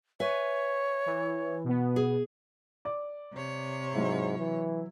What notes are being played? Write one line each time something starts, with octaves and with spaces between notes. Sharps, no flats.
B4 C#5 E5 G#5
E3
B2 B3
G#4
D5 D6
C3 C#5
G#2 F#3 E4
E3